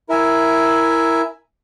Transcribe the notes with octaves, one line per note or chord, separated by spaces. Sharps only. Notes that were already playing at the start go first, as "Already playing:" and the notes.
E4 A#4 E5 G#5